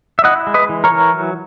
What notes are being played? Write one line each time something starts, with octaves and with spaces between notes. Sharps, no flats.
E5
E4 D#5 F#5
G#3
B4 D#5
E3
A#4 C#5
E3
F#3